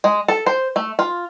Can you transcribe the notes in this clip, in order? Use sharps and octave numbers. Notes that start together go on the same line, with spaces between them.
G#3
A4
C5
A3
F4